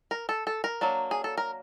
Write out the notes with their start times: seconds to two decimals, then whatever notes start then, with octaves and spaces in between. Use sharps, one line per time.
0.11 A#4
0.29 A4
0.47 A4
0.64 A#4
0.81 F#3 A#3 D4
1.11 G#4
1.24 A4
1.37 A#4